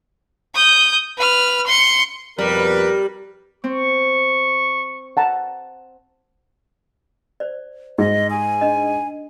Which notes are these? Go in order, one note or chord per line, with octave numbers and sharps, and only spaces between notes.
D#6 G6
B4 F6
C6 C#7
F2 B2 G3 A#4 B4
C4 C#6
F#5 A5 A#5
C5 D5
G#2 D#5
G#4 G#5 D#6
D4 D#5